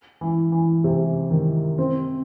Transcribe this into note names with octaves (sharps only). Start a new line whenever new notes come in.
E3
E3
C3
D#3
C4